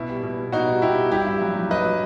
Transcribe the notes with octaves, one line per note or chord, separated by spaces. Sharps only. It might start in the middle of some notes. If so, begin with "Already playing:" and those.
Already playing: B2 E4
G3
B2
B2
B2 D#4 F#4
G3
B2 E4 G4
G3
G2 E4 G4
G2
F#3
F#3
F#3 B4 D#5
F#3